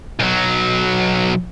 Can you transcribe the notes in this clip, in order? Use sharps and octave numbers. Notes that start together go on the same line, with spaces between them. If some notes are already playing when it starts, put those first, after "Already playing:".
B1 F#3